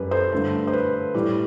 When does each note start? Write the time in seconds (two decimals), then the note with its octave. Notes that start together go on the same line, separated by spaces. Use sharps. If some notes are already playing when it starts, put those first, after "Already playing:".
Already playing: F#2 G3 B4
0.11 A4 C5
0.32 G2 D3 A3
0.67 C5
0.73 B4
1.14 A2 E3 G3